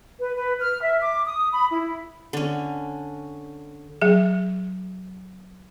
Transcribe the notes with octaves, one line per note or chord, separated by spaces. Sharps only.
B4
B4
F6
E5
D6
D#6
B5
E4
D3 C#4
F#3 G#4